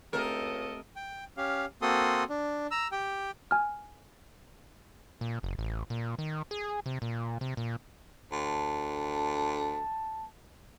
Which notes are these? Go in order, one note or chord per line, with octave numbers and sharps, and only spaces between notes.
C#2 A3 C4 G4 A4 A#4 D#5
G5
C#4 G4 F5
A#3 C4 F#4 A4 C6 D#6
D4
A#5 E6
G4 G5
G#5 F6
A#2
F#1
A1
A#2
D#3
G#4
C3
A#2
C3
A#2
D2 A5